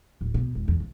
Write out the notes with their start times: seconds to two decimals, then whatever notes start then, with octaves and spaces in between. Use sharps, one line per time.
0.21 D1
0.34 B2
0.55 E1
0.68 E2
0.80 C3